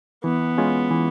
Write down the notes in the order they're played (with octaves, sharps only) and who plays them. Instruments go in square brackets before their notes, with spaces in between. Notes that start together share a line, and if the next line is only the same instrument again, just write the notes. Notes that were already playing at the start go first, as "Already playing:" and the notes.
[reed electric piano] E3 [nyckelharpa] B3
[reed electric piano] G#3 C#4 F4 G#4
E3